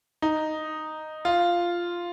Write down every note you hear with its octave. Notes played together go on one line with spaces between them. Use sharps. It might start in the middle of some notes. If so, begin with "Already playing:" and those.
D#4
F4